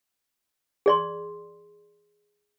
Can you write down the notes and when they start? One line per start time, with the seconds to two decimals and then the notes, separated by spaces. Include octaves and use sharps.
0.86 G#4 D5 C6